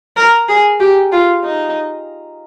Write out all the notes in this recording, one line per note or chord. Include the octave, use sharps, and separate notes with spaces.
A#4
G#4
G4
F4
D#4